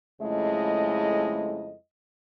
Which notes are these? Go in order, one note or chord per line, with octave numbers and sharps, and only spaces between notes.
F2 C#3 G#3 A3 E4 D#5